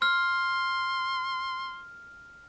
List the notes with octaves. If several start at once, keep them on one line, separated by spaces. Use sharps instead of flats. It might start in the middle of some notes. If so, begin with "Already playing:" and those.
C6 F6